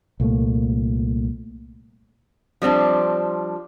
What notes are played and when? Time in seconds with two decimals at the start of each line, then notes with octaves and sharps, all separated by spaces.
0.20 C2 A#2 A3 A#3
2.62 F3 G3 C4 D4